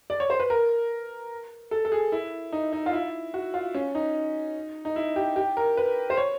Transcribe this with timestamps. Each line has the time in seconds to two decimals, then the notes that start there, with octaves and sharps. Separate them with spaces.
0.10 D5
0.20 C#5
0.30 C5
0.40 B4
0.50 A#4
1.71 A4
1.85 A4
1.92 G#4
2.12 E4
2.53 D#4
2.73 D#4
2.86 F4
2.93 E4
3.34 F#4
3.54 F4
3.74 C#4
3.95 D#4
4.85 D#4
4.96 E4
5.16 G4
5.36 G4
5.57 A#4
5.77 B4
6.10 C5
6.17 C#5